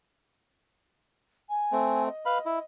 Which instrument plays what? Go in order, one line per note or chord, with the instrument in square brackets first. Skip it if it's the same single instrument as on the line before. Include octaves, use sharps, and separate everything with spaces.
[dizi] G#5
[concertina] A3 C4
[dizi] D#5
[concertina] B4 F5 B5
E4